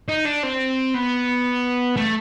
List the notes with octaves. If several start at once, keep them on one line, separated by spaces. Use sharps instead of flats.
D#4
D4
C4
B3
A3